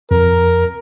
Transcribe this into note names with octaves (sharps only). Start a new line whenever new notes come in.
F2 A#4